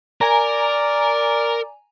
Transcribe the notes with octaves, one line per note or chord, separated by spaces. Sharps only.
A#4 D5 G#5 A#5